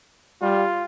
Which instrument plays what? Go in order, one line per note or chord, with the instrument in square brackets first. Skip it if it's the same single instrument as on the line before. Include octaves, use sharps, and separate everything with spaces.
[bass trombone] G3 [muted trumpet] F4